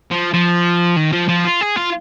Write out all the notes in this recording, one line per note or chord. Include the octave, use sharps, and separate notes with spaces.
F3
F3
D#3
F3
F3
F4
G#4
F4